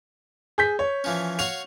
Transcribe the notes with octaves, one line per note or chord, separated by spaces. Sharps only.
G#4 G6 B6
C#5
E3 F3 C#4
F#4 C#5 F5 F7